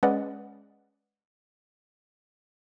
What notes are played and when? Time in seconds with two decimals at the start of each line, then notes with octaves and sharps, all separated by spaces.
0.03 G#3 C#4 B4 D5 D#5 F#5